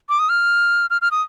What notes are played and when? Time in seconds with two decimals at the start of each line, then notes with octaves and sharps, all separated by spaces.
0.09 D6
0.19 D#6
0.29 F6
0.90 F6
1.02 F6
1.11 D#6